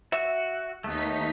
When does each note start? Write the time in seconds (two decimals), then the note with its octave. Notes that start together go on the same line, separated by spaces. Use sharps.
0.12 F#4 E5
0.84 D#2 A3 B3 D#4 B6